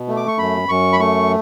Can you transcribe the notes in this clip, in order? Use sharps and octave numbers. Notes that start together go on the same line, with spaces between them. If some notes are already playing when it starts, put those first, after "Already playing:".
Already playing: B2
A3
D6
C#6
F#2 B5
F#2 C#6
B5
A3 C#6